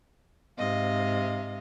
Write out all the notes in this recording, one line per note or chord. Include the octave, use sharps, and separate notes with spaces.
G#2 C3 D#5 F5